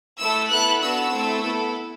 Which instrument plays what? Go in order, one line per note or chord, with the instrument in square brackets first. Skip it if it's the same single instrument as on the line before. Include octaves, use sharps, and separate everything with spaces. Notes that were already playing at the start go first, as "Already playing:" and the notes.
[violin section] A3 E4 A4 E6
B3 E4 A4 F#6
B3 D4 F#4 A4 E6
A3 C4 E4 A4
B3 E4 A4